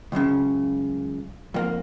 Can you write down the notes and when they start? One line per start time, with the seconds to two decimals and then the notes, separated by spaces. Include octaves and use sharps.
0.12 C#2 F#2 A2 C#3
1.54 F2 G#2 A#3